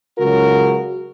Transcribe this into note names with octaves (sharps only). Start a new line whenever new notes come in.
C#2 C#3 F#3 F#4 A#4